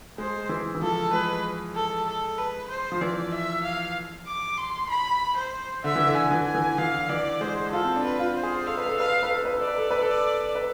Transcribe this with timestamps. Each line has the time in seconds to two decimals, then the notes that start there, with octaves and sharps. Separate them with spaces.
0.18 G#3 C5
0.49 E3
0.75 E3
0.82 F3 A4
1.13 G#3 B4
1.75 A4
2.07 A4
2.38 B4
2.70 C5
2.92 F3
3.01 E3 D5
3.32 E5
3.64 F5
4.27 D6
4.58 C6
4.90 B5
5.37 C5
5.84 D3 E5
5.96 E3
6.07 D3
6.15 G#5
6.31 E3
6.47 G#5
6.55 E3
6.78 E3 F5
7.09 E3 D5
7.41 G#3 C5
7.72 F4 A4
7.85 C4
7.96 D4
8.04 B4
8.19 F4
8.36 C5
8.43 G#4
8.66 A4 F5
8.78 B4
8.89 A4
8.98 B4 F5
9.12 A4
9.23 B4
9.34 A4
9.45 B4
9.57 A4 D5
9.68 B4
9.79 A4
9.91 B4
10.02 A4
10.08 D5
10.55 B4